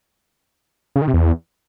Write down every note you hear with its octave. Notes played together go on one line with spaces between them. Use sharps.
C#3
D#3
C3
E2